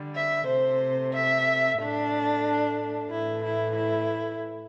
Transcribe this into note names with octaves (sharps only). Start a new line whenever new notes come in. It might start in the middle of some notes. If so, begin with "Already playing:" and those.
Already playing: D3 G3
E5
C3 A3 C5
E5
A2 A3 D4
A2 E3 A3 E4
E4
E4